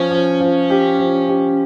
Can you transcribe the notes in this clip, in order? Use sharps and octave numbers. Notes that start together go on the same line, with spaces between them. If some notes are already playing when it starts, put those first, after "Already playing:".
Already playing: F3 C#4
F3
F3
G4
F3
G4